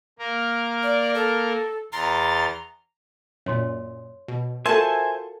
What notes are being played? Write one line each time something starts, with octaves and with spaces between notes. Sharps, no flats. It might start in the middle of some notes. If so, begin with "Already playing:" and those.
A#3 A#4
D5
A4
E2 A#5 C6 A6
F#2 A#2 C#5 C6
B2
F4 F#4 A4 A#4 C5 E5 G#5 A5